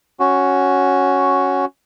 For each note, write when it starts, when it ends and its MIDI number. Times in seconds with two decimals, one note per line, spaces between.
0.20 1.65 61
0.20 1.65 66